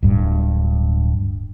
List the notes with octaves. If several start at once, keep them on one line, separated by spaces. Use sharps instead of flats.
D1 G2